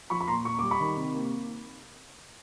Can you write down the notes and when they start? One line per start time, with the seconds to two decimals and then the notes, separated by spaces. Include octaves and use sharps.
0.10 F3 B5 C#6
0.20 B5
0.27 A#2 A#5 C6
0.45 A#2 C#6
0.59 G3 D6
0.71 B5 C#6
0.80 D#3
0.97 C3
1.14 A#3